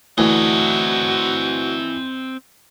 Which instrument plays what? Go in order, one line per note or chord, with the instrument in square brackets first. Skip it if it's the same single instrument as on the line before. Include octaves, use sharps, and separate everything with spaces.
[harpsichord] D2 [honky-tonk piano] E3 [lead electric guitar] C4 D#5 [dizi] F#4